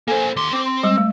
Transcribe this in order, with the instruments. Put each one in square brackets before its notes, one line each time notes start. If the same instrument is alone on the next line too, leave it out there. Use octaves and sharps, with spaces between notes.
[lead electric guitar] A#3 C5 [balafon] A4 [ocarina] G#5
[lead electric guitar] D#2 C6 [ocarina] D6
[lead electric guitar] C4 [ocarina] D6
[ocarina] C6
[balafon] G3 G#3 [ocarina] E6
[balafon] A3